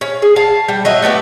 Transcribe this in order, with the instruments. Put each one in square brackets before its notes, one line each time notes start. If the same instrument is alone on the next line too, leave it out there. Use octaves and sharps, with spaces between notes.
[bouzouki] C#4
G#4
F5 A5
G3
F#3 D#5 E5
A3 B3 F#4 G4